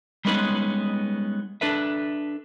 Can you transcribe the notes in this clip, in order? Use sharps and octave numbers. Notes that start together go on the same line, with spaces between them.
G3 G#3 B3 C#4 D#4 B4
D4 A4 B4 E5